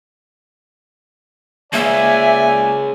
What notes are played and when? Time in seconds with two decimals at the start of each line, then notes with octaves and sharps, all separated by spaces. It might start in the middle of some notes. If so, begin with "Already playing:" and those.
1.73 G#3 A#3 C#4 D5 E5 G#5